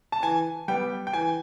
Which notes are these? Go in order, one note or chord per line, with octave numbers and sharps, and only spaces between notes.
A5
E3 G#5
G3 B3 G5
G5
E3 G#5